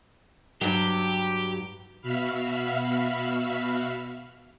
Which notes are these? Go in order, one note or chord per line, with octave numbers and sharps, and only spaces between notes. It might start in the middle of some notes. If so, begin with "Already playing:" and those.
G2 F#3 G4
B2 F#4 E5 F5 B5 F6